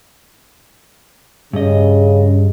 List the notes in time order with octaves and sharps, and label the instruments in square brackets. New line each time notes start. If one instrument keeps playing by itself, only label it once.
[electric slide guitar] G2 D#5 [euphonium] C#3